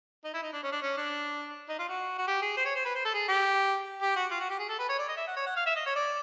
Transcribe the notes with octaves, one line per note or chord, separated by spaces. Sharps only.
D#4
E4
D#4
D4
C#4
D4
C#4
D4
D#4
F4
F#4
F#4
G4
G#4
C5
C#5
C5
B4
C5
A4
G#4
G4
G4
F#4
F4
F#4
G4
G#4
A4
B4
C#5
D5
D#5
E5
F#5
C#5
F#5
F5
E5
D#5
C#5
D5